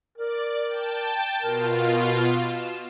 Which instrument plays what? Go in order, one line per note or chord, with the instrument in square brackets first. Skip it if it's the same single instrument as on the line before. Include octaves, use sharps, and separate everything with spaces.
[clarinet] A#4 [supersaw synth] D5
[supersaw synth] G5 A5
[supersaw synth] B2 F4 [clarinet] A#4
[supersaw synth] E7